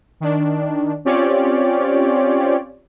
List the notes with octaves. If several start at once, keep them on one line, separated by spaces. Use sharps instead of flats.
D#3 D4
C4 C#4 F4 G4 C#5 D5